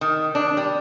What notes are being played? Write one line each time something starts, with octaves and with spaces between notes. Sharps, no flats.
D#3
D4
G3